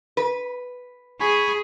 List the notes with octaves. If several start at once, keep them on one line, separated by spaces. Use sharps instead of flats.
B4
G#4 G#5 B5 C#6